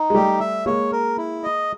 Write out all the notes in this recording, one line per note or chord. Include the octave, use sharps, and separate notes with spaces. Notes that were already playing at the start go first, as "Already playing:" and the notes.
Already playing: D#4
G#3
G3 A3 G4
E5
G#3 A#3 C#5
A#4
E4
D#5